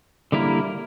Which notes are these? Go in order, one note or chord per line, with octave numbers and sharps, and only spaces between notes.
D3 G3 A#3 E4 A#4